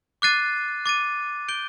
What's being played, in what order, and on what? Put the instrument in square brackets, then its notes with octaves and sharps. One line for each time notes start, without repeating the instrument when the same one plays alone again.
[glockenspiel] D6 F#6 A6 C7 D#7
D6 A6 D#7
G6 D7 G7